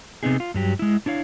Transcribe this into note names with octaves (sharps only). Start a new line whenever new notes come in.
C3 B3 C4 D#4 G#4
F4
G2 F#3 G4
G#3 E4
D4 E4 C#5 F5